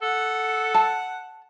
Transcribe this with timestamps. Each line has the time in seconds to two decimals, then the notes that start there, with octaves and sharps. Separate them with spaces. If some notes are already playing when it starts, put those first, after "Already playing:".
0.02 A4 F#5
0.74 A5